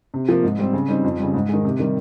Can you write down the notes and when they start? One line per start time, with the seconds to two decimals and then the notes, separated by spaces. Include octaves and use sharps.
0.14 C3
0.29 F3 A#3
0.43 G#2
0.58 G3 C4
0.73 C#3
0.89 G3 C4 D#4
1.04 F2
1.19 C#3 G3
1.34 G#2
1.49 D#3 G#3
1.65 C3
1.79 D#3 G3